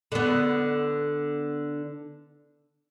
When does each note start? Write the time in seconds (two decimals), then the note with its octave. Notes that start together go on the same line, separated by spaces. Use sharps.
0.12 D3 B3